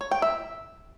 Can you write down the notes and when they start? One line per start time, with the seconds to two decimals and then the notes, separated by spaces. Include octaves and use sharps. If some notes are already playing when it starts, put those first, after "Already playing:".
0.01 C#5
0.11 G5
0.22 E5